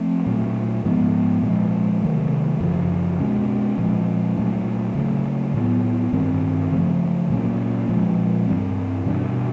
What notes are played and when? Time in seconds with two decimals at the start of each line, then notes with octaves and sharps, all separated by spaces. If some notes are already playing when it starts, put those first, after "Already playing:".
Already playing: F3 A3 C4
0.26 A#2 F#3 A3
0.85 G#2 F3 G#3 B3
1.43 A#2 F3 G#3
2.02 C3 D#3 F#3 A3
2.60 F#2 C#3 F3
3.20 B2 G#3 C#4
3.78 A#2 F3 G#3
4.36 A#2 F#3 A3 C#4
4.95 C#3 F#3 A3
5.54 A2 F#3 B3
6.13 G2 D#3 G3 C4
6.71 C#3 F3 A3
7.30 A#2 F#3 A#3 C#4
7.89 A#2 F3 G#3
8.47 G2 E3 G3 C4
9.06 B2 G3 A#3 D4